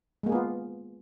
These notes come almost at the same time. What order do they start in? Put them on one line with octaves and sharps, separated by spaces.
G#3 A#3 G#4 B3 F4